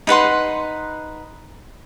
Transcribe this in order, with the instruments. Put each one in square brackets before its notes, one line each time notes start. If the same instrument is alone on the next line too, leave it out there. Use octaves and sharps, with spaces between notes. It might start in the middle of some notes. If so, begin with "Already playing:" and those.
[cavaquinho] D#4 B4 F#5 C6